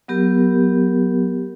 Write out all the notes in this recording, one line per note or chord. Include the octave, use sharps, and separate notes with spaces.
F#3 B3 G4 A#4